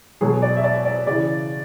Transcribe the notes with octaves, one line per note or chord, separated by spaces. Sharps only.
B2 F#3 G#4
D5
E5
D5
D5
C#3 E3 D5